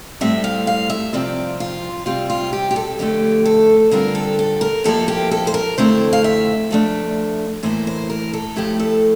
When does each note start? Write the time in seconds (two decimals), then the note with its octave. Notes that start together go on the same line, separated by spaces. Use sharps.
0.21 A2 G3 C4 E5
0.44 F5
0.67 F5
0.90 E5
1.13 C3 F3 C4 F4 D5
1.60 F4
2.06 C3 G3 C4 F4
2.30 F4
2.53 G4
2.71 G4
2.76 A4
2.99 F2 D3 A3 G4
3.46 A4
3.91 D3 G3 C4 F4 A#4
4.15 A4
4.39 A4
4.61 A#4
4.84 F2 C3 F3 A#3 E4 A4
5.08 G4
5.31 A4
5.47 C5
5.54 A#4
5.78 F2 D3 A3 C4 E4 C5
6.13 F5
6.24 E5
6.71 C3 F3 A3 D4
7.63 A2 E3 A#3 E4 C5
7.87 C5
8.10 A#4
8.33 A4
8.56 A2 F3 A3 E4 G4
8.80 A4